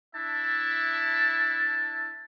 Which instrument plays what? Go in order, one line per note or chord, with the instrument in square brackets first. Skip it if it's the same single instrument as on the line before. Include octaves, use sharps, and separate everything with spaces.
[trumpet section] D4 E4 E5 A5